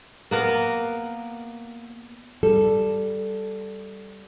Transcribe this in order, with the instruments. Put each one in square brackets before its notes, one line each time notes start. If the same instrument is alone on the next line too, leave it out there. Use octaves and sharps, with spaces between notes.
[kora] A#3 B3 A#4
[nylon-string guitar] G3 A4